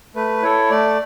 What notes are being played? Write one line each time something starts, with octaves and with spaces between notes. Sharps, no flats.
A3 B4
E4 A4 C#5
A3 D5